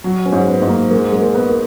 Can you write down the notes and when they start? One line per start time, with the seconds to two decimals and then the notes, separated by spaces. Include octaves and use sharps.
0.04 F#3
0.25 C#4
0.32 G#2
0.48 B3
0.62 G#2
0.69 A#3
0.91 G#3 A#3
1.12 G#3
1.21 A#3
1.35 B3
1.49 A#3